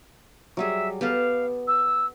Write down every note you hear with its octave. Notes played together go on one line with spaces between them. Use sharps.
F#3 G3 G#4 E5
B3 G4 A4 F5
E6